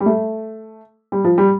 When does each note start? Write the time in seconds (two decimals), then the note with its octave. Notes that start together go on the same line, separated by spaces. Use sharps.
0.01 G3
0.06 A3
1.12 G3
1.24 F3
1.38 G3